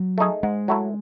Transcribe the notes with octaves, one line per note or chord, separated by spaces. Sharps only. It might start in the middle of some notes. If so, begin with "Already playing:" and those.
Already playing: F#3
A3 D#4 G#4
G#2 G#3
F#3 A3 E4